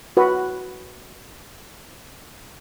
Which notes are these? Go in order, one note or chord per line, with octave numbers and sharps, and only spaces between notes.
F#4 B4